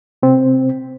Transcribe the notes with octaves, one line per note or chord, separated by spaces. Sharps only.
C3 C4